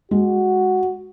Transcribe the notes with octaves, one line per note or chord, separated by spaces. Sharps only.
G#3 F#4